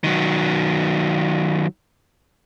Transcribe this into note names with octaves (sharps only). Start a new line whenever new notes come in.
D#3 F#3